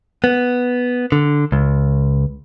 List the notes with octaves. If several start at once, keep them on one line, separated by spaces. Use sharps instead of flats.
B3
D3
C#2